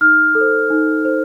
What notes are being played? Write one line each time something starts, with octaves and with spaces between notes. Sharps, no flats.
D#4 F6
A4
C5
D#4
A4 C5